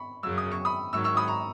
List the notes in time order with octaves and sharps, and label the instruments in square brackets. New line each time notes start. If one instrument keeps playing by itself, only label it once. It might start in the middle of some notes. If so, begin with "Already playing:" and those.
Already playing: [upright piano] B5 C#6
[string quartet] F#2 C#3 F#3 [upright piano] E6
[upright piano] D#6
C#6
B5 D#6
[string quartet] G#2 D#3 F#3 [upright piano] C#6 E6
[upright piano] C#6 E6
B5 D#6
A#5 C#6